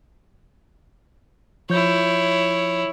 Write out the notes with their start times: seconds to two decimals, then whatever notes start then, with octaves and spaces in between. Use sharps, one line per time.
1.70 F3 E4 C#5 G6